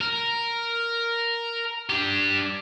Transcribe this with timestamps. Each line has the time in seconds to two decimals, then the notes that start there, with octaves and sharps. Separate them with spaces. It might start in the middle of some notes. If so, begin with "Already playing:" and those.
0.01 A#4
1.90 D4 G4